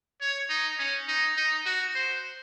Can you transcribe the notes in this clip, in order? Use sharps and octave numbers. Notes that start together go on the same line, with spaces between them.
C#5
D#4
C#4
D#4
D#4
F#4
C5